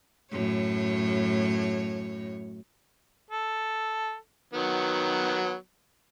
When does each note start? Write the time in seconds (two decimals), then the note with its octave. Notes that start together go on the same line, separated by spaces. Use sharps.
0.31 F#2 A2 C#5
3.31 A4
4.54 D#3 F#3 B3